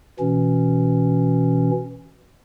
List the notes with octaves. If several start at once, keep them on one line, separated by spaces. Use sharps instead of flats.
B2 E3 C#4